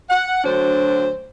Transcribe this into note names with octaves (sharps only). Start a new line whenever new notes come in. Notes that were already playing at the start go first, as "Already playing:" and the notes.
F#5
D2 F#3 D4 C5